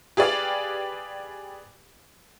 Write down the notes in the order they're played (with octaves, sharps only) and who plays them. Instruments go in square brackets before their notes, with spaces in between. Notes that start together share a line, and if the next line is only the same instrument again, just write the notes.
[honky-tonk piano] G4 G#4 B4 D5 F5